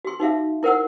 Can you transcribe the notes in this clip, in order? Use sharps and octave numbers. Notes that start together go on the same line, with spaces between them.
F#4 C6
D#4 F#4 E5 F5
E4 A#4 C5 F#5 E6